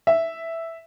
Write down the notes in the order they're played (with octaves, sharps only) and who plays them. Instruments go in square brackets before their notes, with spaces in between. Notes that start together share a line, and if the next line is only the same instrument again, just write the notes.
[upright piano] E5